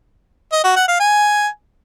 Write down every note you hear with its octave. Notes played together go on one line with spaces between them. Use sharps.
D#5
F#4
F#5
F5
G#5